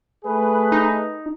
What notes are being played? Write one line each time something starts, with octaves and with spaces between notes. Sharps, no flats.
A3 G#4 B4
D#4